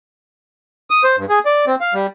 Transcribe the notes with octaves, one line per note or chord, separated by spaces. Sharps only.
D#6
C5
G2
G#4
D5
C4
F5
G3